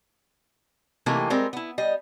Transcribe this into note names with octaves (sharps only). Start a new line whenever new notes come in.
C3 E3 A3 A#3 D#4 G4
G3 G#3 C4 A#4
B3 E4
G3 D#5